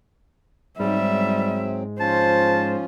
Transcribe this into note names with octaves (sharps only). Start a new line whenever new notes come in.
G#2 F#3 G3 C4 E5
F3 C#4 F4 C5 A5